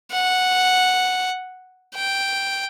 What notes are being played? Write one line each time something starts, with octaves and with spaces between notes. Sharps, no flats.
F#5
G5